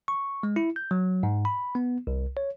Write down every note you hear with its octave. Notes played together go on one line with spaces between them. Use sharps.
C#6
G#3
E4
G6
F#3
G#2
B5
B3
C2
C#5